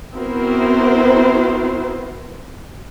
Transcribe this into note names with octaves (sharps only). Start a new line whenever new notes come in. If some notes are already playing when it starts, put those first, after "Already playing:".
B3 C4 E4 F#4 A#4 C5